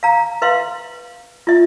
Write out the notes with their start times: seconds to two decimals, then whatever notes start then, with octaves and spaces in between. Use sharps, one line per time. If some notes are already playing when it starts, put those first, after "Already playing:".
0.03 F5 A#5
0.42 B4 E5 F5 C6
1.47 F4 E5